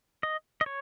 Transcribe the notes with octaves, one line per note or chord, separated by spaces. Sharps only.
D#5
D#5
C#5